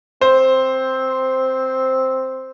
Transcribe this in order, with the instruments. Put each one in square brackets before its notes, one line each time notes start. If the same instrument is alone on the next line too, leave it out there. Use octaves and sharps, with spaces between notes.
[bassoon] C4 [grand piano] C5